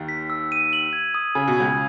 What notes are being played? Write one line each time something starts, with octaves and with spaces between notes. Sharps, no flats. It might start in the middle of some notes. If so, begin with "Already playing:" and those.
Already playing: D#2 D#3
B6
E6
D#7
F#7
G#6
D#6
C#3 G#5
B2
C#2 C#3 G#6